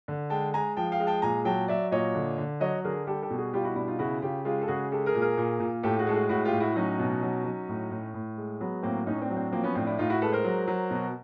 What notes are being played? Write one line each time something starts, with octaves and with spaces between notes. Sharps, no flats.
D3
G#3 G5 A5
G#3 G#5 A#5
F3 G5 A5
F5 G5
G#3
G5 A5
A#2 G#5 A#5
F#3 G5 A5
F#3 D5 E5
A#2 C#5 D#5
D3
D3
F#3 C#5 D#5
D3 G#4 A#4
G3 G4 A4
G4 A4
B2
F#4 G#4
G3 F4 G4
E4 F#4
B2 D4 E4
D#4 F4
C#3 E4 F#4
C#3 F4 G4
G#3 F4 G4
A4
C#3 F#4 G#4
G#3 G4 A4
G#4 A#4
A#2
G#4 A#4
A#2
A#2
A2 G4 A4
F#4 G#4
G#3 A4
F#4 G#4
A2 E4 F#4
F4 G4
A2
E4 F#4
F#3 C#4 D#4
B2
F#3
F#3
A2
A2
A2
G#3
F#3 B3
A2 A#3 C4
A2 C#4 D#4
C4 D4
F#3
C4 D4
F3 A#3 C4
B3 C#4
A2 C4 D4
D4 E4
A2 D#4 F4
E4 F#4
G#3 A4 B4
A#4 C5
F#3
F#3
B2